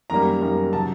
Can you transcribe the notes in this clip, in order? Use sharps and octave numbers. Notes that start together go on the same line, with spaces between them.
F#2 D#3 G3 A#3 A#5
F#2 D#3 G3 A#3
C#3 F#3 A5